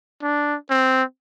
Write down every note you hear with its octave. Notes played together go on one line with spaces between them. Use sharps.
D4
C4